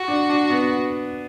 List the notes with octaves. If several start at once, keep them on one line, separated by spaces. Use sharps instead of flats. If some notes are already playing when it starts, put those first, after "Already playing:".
Already playing: F#4
D4
D4
B3